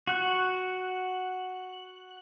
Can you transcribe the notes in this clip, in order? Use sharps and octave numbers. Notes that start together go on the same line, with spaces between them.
F#4 F#6